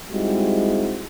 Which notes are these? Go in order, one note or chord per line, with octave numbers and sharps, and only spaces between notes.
G3 G#3 C4 D#4 E4 F#4